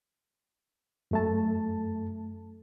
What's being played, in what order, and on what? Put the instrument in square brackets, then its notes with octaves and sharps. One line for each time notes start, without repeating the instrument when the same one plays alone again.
[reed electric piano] F#2 A3 A5